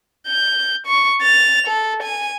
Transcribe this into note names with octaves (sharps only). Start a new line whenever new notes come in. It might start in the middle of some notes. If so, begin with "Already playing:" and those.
G6
C#6
A6 F7
A4
G#5